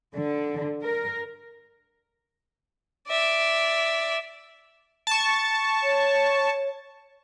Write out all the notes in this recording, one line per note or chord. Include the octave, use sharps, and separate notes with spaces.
D3
A#4
D5 E5
A5 C#6
C#5